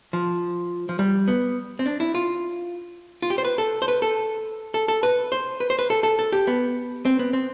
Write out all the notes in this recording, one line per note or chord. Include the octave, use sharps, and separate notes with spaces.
F3
F3
G3
B3
C4
D4
E4
F4
F4
G4
C5
B4
A4
C5
B4
A4
A4
A4
B4
C5
B4
C5
B4
A4
A4
A4
G4
B3
C4
B3
C4